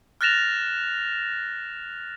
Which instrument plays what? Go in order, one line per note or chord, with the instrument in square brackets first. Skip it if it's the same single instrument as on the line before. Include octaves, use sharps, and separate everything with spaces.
[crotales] F6 F#6 A6 A#6 E7 F7